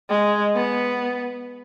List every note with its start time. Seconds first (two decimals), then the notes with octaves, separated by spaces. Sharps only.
0.10 G#3
0.55 B3